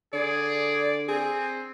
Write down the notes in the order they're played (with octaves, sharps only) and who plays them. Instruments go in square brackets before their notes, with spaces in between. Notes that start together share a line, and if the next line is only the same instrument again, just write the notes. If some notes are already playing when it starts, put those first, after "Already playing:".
[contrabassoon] D3 [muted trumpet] G#4 [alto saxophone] D5
[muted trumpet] C4 [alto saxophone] G#4